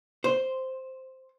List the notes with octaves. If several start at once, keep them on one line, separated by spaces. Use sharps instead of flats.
C5